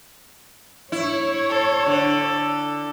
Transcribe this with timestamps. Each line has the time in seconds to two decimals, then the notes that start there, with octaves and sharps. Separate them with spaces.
0.92 E4 C#5
1.49 A4
1.86 D3